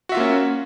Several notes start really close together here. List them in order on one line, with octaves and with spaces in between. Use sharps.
F#4 E5 F4 A#3 C#4